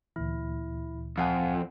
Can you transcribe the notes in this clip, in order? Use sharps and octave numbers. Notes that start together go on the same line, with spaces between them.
D2 A#2 E3 E4
F2 F5 F#5 G#5